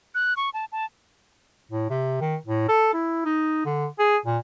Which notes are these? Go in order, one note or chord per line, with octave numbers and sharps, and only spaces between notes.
F#6
C#6
A5
A5
A2
C3
D#3
A2
A4
E4
D#4
D3
G#4
A#2